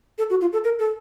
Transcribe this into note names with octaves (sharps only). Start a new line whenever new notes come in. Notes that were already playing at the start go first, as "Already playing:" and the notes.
A4
F#4
F4
A4
A#4
A4